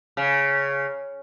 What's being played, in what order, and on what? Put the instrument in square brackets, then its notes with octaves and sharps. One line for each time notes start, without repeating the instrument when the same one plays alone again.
[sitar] C#3